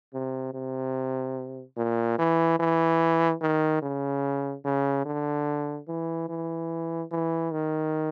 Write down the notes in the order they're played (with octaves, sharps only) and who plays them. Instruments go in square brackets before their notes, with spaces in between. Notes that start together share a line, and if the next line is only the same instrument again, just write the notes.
[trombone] C3
C3
A#2
E3
E3
D#3
C#3
C#3
D3
E3
E3
E3
D#3